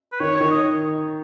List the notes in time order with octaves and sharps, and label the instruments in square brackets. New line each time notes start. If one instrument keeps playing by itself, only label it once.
[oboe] B4
[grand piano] D#3 [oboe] C#5
[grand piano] D#3 [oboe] C#5
[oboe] D#5